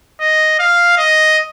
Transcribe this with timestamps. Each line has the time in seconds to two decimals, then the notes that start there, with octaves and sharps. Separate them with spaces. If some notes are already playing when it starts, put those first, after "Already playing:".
0.21 D#5
0.59 F5
0.97 D#5